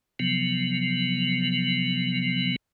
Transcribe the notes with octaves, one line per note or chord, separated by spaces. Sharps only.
C3 F3 F#3 B3